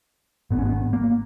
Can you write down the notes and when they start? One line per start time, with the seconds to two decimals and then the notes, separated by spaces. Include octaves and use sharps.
0.50 G#1 G#2 B3
0.58 C#4
0.65 B3
0.93 A#3